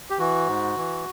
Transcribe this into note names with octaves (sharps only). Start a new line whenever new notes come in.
G4
E3 F#4
G#2
E3